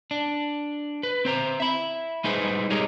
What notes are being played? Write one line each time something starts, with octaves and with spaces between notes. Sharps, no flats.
D4
B4
C4 C5 A#5
E5 B5
G3 G#3 D#4 G#4 B4 C5
G4 G#4 A#4 C#5 D#5